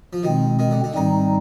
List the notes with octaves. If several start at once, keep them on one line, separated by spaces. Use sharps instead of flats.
F3
B2 D#3 G#3 C4
D#3
D3
D3
G#2 D#3 G3 C4 D#4